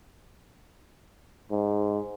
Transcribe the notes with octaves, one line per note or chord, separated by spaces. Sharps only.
G#2